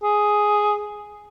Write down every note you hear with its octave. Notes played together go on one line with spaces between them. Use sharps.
G#4